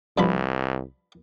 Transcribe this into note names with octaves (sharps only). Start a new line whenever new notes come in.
C2 G2 F3 B5